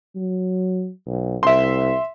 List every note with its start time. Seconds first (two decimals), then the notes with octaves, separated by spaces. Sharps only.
0.15 F#3
1.07 B1
1.43 C2 E5 C6